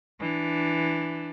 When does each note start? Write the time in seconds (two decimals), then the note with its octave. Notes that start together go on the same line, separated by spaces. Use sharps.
0.20 E3 D4